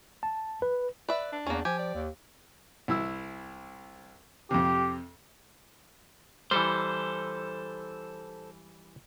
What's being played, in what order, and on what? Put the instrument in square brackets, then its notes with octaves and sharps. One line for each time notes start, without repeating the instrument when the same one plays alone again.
[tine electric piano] A5
B4
[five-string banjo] B4 E5 [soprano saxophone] D5
[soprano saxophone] D4
[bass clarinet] E2 [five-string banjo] A#3 C#4
[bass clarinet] F3 [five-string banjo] G4 [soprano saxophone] G#5
[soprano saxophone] D5
[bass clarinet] D#2
[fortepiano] C2 E4 E6
[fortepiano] F2 C3 [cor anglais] G4
[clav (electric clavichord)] E3 G3 [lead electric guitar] A4 C5